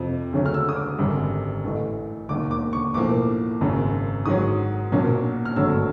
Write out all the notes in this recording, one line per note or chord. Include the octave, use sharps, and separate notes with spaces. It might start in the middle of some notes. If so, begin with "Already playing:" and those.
Already playing: F2 C3 F3
D2 C#3 F#3 A3 C#4
F6
E6
D#6
D6
G#1 F#2 D3 G3
A1 A2 E3 A3
E1 D#2 D#3 D6
D6
C#6
B1 A2 F3 A#3 D6
G#1 F#2 C#3
G#2 D#3 F#3 D#6
B1 A#2 F#3 A#3 C#4
F6
G#1 G2 D3 F#3 A3 E6